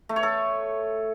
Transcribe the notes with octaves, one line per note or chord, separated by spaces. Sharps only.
A3
C#5
A4